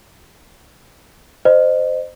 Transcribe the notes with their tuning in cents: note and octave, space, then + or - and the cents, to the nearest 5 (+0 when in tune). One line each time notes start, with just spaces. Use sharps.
C5 -10 D#5 -30